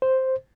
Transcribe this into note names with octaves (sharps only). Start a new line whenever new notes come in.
C5